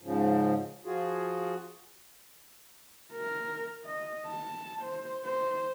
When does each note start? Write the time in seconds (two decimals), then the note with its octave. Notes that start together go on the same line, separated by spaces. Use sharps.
0.02 G#2 C#3 F3
0.85 F3 F4 F#4 G#4
3.13 A#4
3.85 D#5
4.27 A5
4.83 C5
5.24 C5